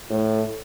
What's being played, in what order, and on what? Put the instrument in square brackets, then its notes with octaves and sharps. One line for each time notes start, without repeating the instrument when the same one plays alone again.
[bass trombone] A2